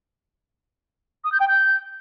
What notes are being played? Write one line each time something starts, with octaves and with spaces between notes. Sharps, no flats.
D#6
G6
G5
G6